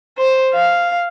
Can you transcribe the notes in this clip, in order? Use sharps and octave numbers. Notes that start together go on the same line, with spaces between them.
C5
F5